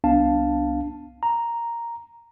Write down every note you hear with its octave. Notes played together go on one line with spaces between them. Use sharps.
C2 B3 D4 F5 A5
A#5